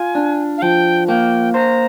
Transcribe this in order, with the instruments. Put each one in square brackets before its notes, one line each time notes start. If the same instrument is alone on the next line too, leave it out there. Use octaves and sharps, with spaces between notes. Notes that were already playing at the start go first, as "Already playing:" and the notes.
Already playing: [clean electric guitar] F4 [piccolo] G#5
[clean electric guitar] D4
[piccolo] F5
[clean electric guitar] F3 [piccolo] G5
[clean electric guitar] A#3 [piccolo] G5
[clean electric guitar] C5 [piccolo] A#5